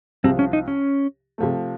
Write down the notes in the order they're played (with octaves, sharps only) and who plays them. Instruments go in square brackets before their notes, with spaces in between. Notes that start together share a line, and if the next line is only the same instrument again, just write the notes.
[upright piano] C2 C3 F3 [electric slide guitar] C4
[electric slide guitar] C#4
D#4
C#4
[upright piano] C3 F3 A3